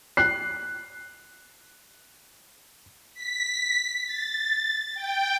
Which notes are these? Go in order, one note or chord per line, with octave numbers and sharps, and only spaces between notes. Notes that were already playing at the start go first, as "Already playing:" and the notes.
F#6 C7
B6
A6
G5